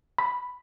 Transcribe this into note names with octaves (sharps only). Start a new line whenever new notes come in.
B5